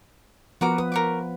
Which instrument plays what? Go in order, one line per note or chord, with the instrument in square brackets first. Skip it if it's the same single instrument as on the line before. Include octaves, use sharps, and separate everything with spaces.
[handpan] F3 B3 B4 [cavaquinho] F#4 A#4 D6
[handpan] B4 [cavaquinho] D#6
[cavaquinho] A#4 C#6 D6